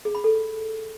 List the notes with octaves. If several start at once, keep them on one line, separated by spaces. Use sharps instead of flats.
G#4
B5
A4